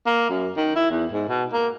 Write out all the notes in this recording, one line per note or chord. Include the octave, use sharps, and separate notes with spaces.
A#3
F#2
D#3
E4
E2
G#2
B2
A#3